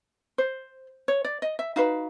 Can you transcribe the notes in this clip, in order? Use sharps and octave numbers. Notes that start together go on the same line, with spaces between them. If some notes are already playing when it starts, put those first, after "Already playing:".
C5
C#5
D5
D#5
E5
D#4 F#4 B4 F5